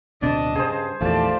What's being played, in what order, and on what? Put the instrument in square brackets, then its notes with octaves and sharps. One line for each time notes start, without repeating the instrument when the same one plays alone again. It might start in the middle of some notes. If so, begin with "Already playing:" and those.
[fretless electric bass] D1 B2 C4 [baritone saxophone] D4 [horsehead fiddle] D#5 A5
[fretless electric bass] G2 [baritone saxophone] C#3 [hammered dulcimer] G#4 C5
[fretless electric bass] A#1 E2 D#3 [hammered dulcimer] F3 D5 [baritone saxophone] A3 [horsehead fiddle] G4 A5